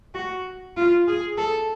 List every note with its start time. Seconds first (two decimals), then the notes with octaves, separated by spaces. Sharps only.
0.15 F#4
0.77 F4
1.08 G#4
1.38 A4